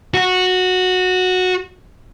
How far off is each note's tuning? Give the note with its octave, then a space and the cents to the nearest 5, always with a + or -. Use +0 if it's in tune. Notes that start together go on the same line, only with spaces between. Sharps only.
F#4 -10